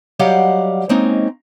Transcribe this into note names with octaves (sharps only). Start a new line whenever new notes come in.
F#3 G3 G4 D#5 F5 F#5
G#3 A#3 C4 C#4 D#4